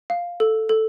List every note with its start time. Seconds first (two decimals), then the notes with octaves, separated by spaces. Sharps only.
0.10 F5
0.40 A4
0.69 A4